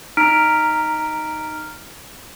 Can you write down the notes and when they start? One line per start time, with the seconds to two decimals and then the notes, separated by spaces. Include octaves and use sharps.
0.17 D#4 A#5 F6 B6 D7